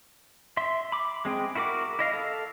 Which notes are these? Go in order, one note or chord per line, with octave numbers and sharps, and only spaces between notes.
E5 C6
B5 D6
G#3 C4 G#4 G5
E4 F#4 A#4 B5 D6
E4 D#5 F5
A4 F5